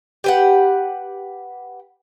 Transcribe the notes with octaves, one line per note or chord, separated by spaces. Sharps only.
G4 B4 F#5